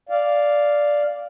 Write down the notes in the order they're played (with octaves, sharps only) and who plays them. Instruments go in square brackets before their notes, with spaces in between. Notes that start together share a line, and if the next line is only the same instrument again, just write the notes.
[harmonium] D5 F5